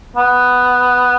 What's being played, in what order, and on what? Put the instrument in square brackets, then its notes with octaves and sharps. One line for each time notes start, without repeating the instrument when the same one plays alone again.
[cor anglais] B3